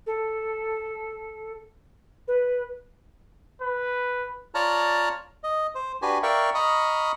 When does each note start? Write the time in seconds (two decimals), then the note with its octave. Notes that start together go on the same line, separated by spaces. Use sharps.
0.06 A4
2.27 B4
3.62 B4
4.55 F4 C#5 D5 A5 A#5 F6
5.44 D#5
5.75 C5
6.02 D4 F#4 G4 B4 G#5
6.23 A#4 D5 E5 F5 G5 C#6
6.54 D#5 A#5 B5 C#6 D#6 F6